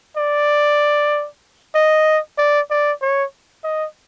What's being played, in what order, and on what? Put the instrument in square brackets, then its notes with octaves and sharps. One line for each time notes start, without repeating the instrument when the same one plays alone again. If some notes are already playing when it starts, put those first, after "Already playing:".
[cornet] D5
D#5
D5
D5
C#5
D#5